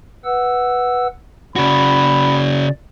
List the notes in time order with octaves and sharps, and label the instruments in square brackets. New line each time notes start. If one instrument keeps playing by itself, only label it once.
[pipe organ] B4 F#5 E6
[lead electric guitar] C#3 F#4 [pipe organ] D5 [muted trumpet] B5